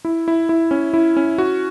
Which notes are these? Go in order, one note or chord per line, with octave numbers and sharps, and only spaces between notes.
E4
E4
E4
C#4
E4
C#4
F#4